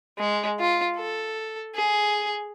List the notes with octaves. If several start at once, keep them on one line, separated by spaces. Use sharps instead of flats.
G#3
F4
A4
G#4